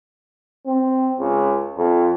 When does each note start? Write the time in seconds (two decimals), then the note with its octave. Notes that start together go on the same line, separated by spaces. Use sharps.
0.66 C4
1.19 C#2
1.77 F2